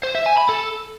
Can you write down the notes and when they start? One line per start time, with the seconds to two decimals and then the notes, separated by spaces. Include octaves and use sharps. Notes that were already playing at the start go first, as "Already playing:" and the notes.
0.03 C5
0.15 E5
0.26 G#5
0.37 B5
0.49 A4